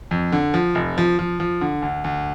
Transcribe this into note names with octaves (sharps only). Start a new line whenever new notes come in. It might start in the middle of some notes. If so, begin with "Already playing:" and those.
F2
D3
F3
F1
F3
F3
F3
D3
D2
D2